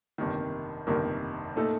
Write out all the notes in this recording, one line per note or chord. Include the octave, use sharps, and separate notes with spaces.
G1 F2 C3 D#3 A#3
G1 F2 C3 D#3 A#3
A#2 A3 D#4 A4